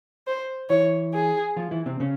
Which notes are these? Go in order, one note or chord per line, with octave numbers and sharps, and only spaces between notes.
C5
E3 E4 C#5
G#4
F3 F4
E3 E4
C3 C4
C#3 C#4